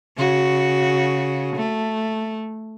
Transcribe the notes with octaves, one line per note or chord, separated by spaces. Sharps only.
C#3 F#4
A3